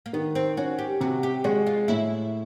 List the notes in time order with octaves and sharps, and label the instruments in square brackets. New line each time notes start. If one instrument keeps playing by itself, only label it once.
[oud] A#3
[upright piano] D#3 [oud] B3
[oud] C4
[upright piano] C#4 [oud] F#4
[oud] G4
[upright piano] C3 [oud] F#4
[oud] G4
[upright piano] G#3 [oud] F#4
[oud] F4
[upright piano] A2 [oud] E4